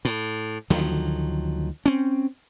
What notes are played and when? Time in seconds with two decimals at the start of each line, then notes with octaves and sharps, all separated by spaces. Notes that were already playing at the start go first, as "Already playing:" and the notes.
0.05 A2
0.70 D2 D#3 F3 F#3
1.86 C4 C#4